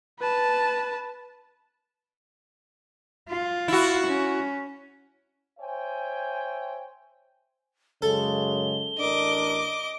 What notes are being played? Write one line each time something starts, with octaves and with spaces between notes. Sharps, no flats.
B4 A5
F4
E4 F#4
C#4
C5 C#5 E5 G5 G#5
F#2 C#3 G#3 A4 G7
A1 D4 A#4 D#5 D6